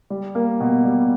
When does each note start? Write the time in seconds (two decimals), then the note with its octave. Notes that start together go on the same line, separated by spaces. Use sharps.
0.10 G3
0.35 A#3
0.60 B2
0.85 G3